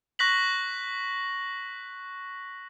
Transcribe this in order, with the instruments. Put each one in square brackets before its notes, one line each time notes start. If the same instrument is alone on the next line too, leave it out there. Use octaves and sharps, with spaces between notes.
[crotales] C#6 F#6 A#6 B6 F#7